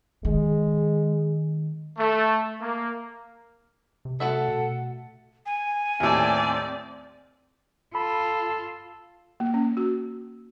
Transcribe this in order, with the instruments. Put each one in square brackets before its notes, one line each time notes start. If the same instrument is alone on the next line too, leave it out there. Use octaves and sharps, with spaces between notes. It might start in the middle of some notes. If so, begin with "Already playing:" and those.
[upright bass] D#3 [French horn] G#3
[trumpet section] A3
A#3
[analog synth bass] C3
[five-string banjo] A3 F#4 E5 [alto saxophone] A4 [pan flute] F#5
[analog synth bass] B2
[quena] G#5
[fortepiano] D#2 A2 [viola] C4 D5
[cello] F4 [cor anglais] A4 [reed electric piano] B5
[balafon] A#3
C#4
F#4